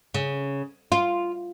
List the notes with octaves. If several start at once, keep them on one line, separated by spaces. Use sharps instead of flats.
C#3
F4